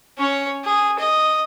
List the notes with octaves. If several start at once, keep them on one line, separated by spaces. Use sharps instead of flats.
C#4 C#5
G#4
D#5